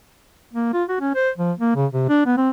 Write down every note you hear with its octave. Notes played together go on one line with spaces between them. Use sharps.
A#3
F4
F#4
C#4
C5
F3
A#3
C#3
C3
D4
B3
C4